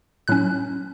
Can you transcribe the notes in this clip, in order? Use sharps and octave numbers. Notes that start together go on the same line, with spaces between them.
A2 F#3 C#4 F#6